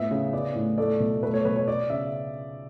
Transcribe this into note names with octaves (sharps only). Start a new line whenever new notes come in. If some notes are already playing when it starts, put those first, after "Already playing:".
Already playing: A2 B3 E5
C#3
B3 D5
A2
A3 D5
B2
A3 B4
C#5
B2 B4
C#5
B3 D5
C#3 E5